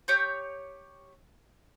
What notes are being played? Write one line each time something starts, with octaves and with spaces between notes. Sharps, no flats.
G4 C#5 G6